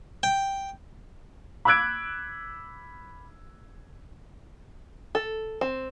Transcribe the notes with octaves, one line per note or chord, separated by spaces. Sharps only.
G5
B5 D6 E6 F#6 G#6 D7
A4
C4